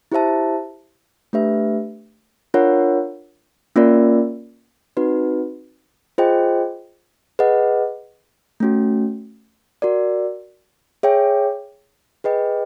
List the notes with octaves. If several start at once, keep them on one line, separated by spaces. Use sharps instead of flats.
E4 G4 C5 E5 A5
A3 D4 G4 B4 E5
D4 F4 A#4 C#5 F#5
A#3 C#4 F4 A#4 D5
C4 D#4 F#4 B4
F4 G#4 C5 D#5 G5
G#4 B4 D#5 F#5
A3 C#4 F#4
F#4 A#4 D5
G#4 C#5 E5 G5
G#4 B4 D#5 G5